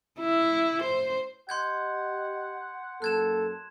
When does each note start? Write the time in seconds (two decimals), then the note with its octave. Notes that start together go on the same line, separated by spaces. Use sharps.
0.19 E4
0.83 C5
1.49 G4 D#5 F#5 C6 G6 G#6
3.02 F#2 F#3 A#3 A4 F#6 G#6 E7